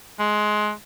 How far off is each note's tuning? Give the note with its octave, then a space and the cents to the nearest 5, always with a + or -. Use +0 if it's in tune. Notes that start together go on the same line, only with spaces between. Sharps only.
G#3 +20